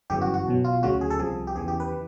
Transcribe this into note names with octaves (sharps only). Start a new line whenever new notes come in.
G1 F#2 C#3 E3 G4
F#4
F#4
B1 B2 F#3
F4
D2 C#3 F#3 F#4
G#4
A4
C2 C3 F3 G#4
G4
E2 C#3 E3 G#4
G4
B4
E3